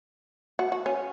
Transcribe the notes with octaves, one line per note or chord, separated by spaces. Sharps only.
F#4
F#4
C#4